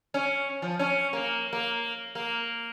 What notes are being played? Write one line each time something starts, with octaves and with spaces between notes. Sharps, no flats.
C#4
F3
C#4
A#3
A#3
A#3